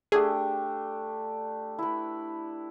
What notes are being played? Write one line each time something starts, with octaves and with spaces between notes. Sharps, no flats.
A3 D4 G4 G#4
E4 B4